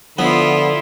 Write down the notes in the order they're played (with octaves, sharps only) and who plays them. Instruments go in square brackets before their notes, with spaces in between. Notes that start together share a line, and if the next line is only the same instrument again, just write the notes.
[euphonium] D3 [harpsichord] F3 B3 [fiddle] E4 F4